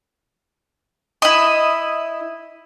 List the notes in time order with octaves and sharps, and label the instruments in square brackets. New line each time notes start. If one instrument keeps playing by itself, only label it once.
[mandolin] E4 D#5